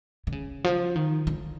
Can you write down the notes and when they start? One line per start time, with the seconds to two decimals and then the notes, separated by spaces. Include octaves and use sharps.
0.27 D3
0.32 C#3
0.64 F3
0.96 D#3
1.27 D3